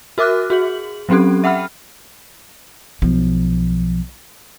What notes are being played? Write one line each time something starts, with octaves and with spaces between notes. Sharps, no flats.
F#4 A#4 E5 D6 F6 F#6
F#4 G#4 F#7
F#3 C4 C#4 G4 A4
E5 F#5 G5 B5 F6
B1 F3